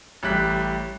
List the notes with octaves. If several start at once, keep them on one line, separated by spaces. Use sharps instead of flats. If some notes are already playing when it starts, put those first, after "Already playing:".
A1 G3 F#6 B6